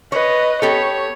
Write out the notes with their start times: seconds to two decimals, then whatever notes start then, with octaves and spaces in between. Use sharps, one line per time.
0.12 B4 C#5 D#5
0.62 B3 G4 A4 C#5